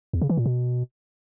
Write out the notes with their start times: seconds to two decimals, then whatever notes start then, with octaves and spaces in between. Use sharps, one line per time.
0.13 E2
0.21 C#3
0.29 E3
0.38 A#2
0.46 B2